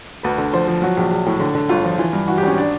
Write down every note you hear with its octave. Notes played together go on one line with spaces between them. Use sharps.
D2 B4
D3
F3 C5
F3
F#3 F#4
A#1
A#1
A2
D3
D3
G1 F4
F3
E3 F4
G2
E3 F#4
G4
G#1 C#4
D4